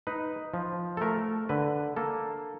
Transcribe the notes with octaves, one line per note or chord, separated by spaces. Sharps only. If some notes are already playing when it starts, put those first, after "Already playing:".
D#4 B4
F3
A4
A3 A#4
D3 B4
A#3 A4